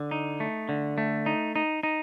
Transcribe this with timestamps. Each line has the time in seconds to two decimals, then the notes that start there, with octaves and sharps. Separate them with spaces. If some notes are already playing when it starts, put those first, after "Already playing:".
Already playing: D3
0.11 D#4
0.40 A3
0.69 D3
0.98 A3
1.26 D#4
1.56 D#4
1.83 D#4